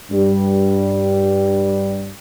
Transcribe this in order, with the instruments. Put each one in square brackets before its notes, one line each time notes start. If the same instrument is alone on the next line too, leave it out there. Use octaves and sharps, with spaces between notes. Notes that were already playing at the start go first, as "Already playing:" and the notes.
[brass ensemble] G2 G3